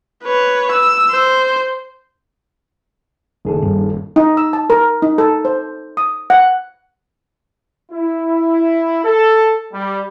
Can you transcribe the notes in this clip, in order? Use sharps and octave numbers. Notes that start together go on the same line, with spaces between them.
B4 C#5
E6
C5
F#1 D#3 G#4 A4
D#1 G2
D#4
E6
A5
A#4
D#4
A4
C5
D#6
F#5
E4
A4
G3